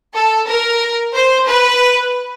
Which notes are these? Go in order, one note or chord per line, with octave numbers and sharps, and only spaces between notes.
A4
A#4
C5
B4